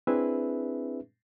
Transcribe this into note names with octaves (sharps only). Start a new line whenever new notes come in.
C4 D4 E4 G#4 B4 E5